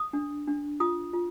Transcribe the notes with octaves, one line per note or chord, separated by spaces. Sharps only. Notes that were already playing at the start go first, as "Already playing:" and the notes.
Already playing: D#6
D4
D4
F4 D#6
F4